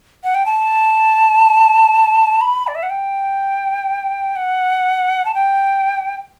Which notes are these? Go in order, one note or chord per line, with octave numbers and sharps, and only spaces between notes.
F#5
G5
A5
B5
D5
E5
F#5
G5
F#5
A5
G5